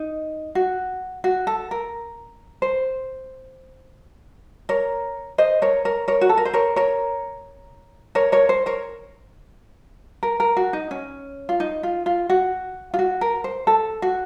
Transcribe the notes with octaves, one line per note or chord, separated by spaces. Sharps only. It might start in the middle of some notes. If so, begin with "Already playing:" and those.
Already playing: D#4
F#4
F#4
A4
A#4
C5
A#4 C#5
C5 D#5
A#4 C#5
A#4 C#5
A#4 C#5
F#4
A4
A#4
C5
A#4 C#5
A#4 C#5
A#4 C#5
A#4 C#5
C5
A#4 C#5
A#4
A#4
F#4
D#4
C#4
F4
D#4
F4
F4
F#4
F4
F#4
A#4
C5
A4
F#4